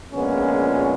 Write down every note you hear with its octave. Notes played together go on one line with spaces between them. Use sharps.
A#1 A#2 G#3 B3 C#4